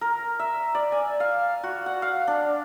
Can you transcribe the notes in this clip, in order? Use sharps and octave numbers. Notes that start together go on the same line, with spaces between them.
A#4
E5
D5
G#5
F5
F#4
F#5
F5
D4